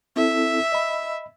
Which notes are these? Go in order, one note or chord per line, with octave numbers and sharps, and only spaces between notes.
C4 E4 A4 E5
D#5 B5